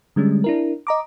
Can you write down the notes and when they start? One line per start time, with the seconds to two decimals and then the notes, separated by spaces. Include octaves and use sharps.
0.16 D3 G3 G#3 C#4
0.44 D4 E4 A#4
0.87 D#5 A#5 D6